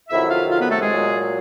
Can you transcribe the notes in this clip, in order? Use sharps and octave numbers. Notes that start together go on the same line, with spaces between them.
F2 C3 D#3 F#3 E4 E5
F4 F5
F4 F5
B3 B4
A3 A4
G#3 G#4
A#2 F#3